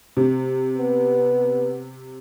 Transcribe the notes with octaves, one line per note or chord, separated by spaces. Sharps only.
C3
B3